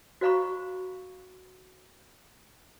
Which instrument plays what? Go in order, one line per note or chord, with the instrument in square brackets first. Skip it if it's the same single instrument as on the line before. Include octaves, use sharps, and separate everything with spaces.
[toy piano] F#4 C5 F5 A#5 B5 C#6